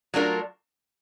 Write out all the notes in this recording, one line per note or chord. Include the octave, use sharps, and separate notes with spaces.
F#3 A3 D4 F4 A#4